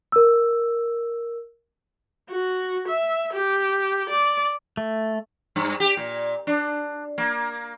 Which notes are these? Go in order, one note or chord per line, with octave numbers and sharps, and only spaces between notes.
A#4 E6
F#4
E5
G4
D5
A3
G2
G4
A#2
D4
A#3